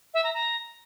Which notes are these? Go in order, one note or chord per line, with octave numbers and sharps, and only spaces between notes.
E5
A#5
A#5